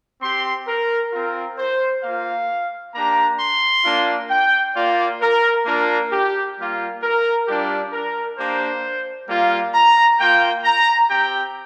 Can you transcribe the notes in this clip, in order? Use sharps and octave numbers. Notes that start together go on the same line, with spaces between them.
C4 G4 C6
A#4
C4 F4 A#4
C5
A#3 F4 F5
A#3 D4 G4 A#5
C6
A#3 D4 F4
G5
A#3 F4 D5
A#4
A#3 D4 F4 A#4
G4
G3 A#3 F4
A#4
G3 D4 F4 G4
A#4
A#3 D4 G4 C5
G3 A#3 F4
A#5
A#3 F4 G5
A#5
C4 G4 G5